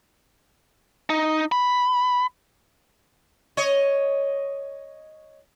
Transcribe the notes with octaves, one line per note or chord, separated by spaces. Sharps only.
D#4
B5
C#5 D#5